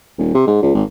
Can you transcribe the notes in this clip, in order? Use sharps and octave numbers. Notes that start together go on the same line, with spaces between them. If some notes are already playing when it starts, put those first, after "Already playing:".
D#1
C3
G#2
C#2
G#1